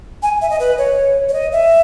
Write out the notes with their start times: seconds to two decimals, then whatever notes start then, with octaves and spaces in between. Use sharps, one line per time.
0.23 G#5
0.41 E5
0.50 D#5
0.60 B4
0.78 C#5
1.29 C#5
1.33 D#5
1.52 E5